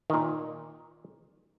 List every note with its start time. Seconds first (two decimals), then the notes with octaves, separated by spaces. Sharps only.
0.10 A#2 D#3